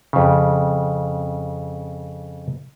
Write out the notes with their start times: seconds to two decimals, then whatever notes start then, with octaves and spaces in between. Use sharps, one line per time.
0.13 F2 C#3